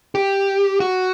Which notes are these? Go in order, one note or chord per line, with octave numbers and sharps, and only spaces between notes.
G4
F#4